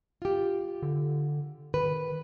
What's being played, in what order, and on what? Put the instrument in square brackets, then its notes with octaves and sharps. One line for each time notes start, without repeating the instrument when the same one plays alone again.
[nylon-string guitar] F4 G4
[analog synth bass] D3
[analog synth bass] D#3 [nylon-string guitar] B4